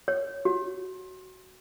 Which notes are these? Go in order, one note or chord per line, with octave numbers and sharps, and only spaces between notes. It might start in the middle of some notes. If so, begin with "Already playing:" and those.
C#5
F#4